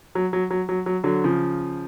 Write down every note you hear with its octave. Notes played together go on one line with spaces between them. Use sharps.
F#3
F#3
F#3
F#3
F#3
D3 F#3
C#3 F3